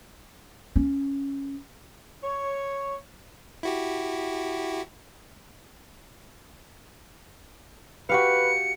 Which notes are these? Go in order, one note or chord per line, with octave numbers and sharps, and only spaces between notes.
C#4
C#5
E4 F#4 G4
F#4 G4 B4 F5 C#7